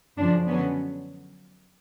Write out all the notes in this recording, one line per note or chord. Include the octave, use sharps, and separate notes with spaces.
F#2 C#3 F3 D4
D3 F#3 B3 C#4